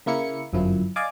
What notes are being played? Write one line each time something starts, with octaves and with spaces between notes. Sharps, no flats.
C#3 A#3 E4 C#7
G1 F#2 F3 E4
D5 D#5 F5 G#5 D6